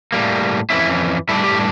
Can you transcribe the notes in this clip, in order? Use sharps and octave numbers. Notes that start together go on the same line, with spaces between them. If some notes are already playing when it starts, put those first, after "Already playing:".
A2 G3 A#3
F2 E3 A#3 C#4 E4
A2 G3 D4 E4
G4